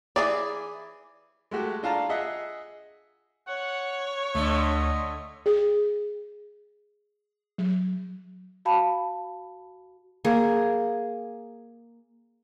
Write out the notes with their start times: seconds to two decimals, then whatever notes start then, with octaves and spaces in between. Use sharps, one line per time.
0.16 E3 G#4 D5
1.51 G#3 A3 F#4 G4
1.83 D4 F4 F5 A5 A#5
2.09 G#4 D#5 E5 F#5
3.48 C#5 F#5
4.35 D2 D3 A3 D#5
5.46 G#4
7.58 F#3
8.65 F#4 F5 A5 B5
10.25 A#3 G#4